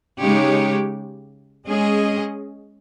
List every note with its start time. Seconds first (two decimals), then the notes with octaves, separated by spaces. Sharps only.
0.19 C#3 G#3 D#4 G4 C#5
1.67 G#3 C#4 G#4 D#5